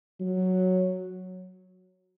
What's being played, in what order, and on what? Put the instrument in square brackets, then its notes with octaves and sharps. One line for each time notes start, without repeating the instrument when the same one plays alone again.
[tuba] F#3